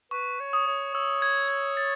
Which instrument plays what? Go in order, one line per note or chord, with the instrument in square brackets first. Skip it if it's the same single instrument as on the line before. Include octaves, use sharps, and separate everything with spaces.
[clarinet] B4 [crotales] C#6
[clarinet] C#5
[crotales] D#6
[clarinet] C#5
[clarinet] C#5 [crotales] E6
[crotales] G#6
G#6
A6